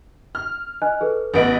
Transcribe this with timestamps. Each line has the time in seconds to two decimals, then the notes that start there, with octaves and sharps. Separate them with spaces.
0.35 F6
0.82 D#5 G#5 F#6
1.01 G#4 A4 B4
1.34 A1 B3 G#4 D#5 D7 F#7